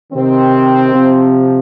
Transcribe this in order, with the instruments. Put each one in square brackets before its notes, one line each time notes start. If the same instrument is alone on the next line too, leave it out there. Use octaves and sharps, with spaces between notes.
[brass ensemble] C3 D#3 C4
C3 F3